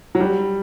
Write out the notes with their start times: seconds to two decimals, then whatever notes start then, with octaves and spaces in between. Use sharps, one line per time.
0.15 F#3
0.20 G3